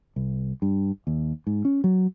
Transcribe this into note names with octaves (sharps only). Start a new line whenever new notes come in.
C2
G2
D#2
G#2
C#4
F#3